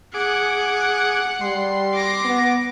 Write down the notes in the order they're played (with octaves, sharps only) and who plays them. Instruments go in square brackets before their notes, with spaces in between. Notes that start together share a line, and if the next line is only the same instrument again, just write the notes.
[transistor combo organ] G#4 D6 [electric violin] F#5
[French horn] G3 [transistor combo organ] C6
[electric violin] D6 A#6
[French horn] B3